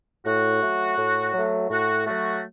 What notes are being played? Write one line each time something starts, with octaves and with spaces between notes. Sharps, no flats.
A2 F#4
F#3 A3
A2
F#3 A3
A2 F#4
F#3 A3 F#4